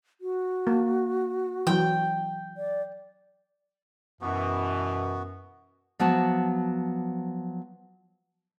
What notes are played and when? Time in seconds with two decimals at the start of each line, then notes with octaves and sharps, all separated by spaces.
0.21 F#4
0.67 A#3
1.67 E3 F#3 G5
2.57 D5
4.21 F#2 B2 E3 B3 F#4
5.99 F3 F#3 B3 F#4 A5